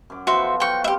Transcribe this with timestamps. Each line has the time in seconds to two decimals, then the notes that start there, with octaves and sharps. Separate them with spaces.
0.10 F#2 D6
0.27 E3 F3 B3 F#4 C5 E5
0.41 A4
0.60 F#3 F4 F#4 G5 C#6
0.84 G3 C4 G4 E5